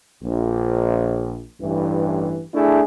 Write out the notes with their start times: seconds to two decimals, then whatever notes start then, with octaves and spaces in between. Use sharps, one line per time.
0.23 A#1
1.61 A1 G2 E3
2.54 A3 D4 E4 G#4